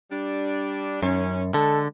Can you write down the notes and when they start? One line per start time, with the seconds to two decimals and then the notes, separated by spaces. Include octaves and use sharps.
0.11 G3 D4
1.03 F#2 D#3 F#3 C#4
1.54 D3 G#3 A4